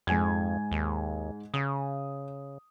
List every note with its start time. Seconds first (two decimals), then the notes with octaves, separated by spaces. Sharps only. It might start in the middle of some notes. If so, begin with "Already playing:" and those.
0.07 F2 G#2 G#5 G#6
0.72 D#2
1.54 C#3 D#6